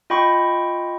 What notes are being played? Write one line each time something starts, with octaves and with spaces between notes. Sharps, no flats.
F4 D#5 G5 B5 C#6